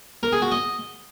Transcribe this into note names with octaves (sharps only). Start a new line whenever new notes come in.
A#4
G#4
F#4
D#5